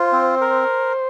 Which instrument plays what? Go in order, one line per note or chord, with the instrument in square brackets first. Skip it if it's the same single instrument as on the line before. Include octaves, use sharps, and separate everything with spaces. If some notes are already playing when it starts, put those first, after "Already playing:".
Already playing: [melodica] F4 [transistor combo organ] C5
[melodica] C4
A#4